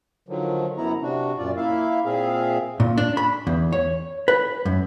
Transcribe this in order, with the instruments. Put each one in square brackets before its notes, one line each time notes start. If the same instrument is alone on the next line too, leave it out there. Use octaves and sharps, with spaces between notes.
[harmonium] D3 D#3 F3 F#3
F#2 B3 E4 A#5
C3 D4 F#4
F#2 A#2 F4 D5
A#3 E4 E5 F5
A#2 C4 G#4 E5 F5
[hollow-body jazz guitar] A#2
D4
B5
E2
C#5
B4
F#2